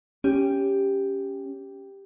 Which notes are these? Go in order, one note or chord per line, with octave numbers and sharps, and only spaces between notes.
C#4 G4